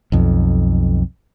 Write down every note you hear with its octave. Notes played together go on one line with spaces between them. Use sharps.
B1 F2